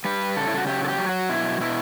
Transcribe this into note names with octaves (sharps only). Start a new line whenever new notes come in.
G3 B4
C#3 A4
E4
F#4
F#3 G4
A4
G4
F#3
F#4
B2 E4
B2 E4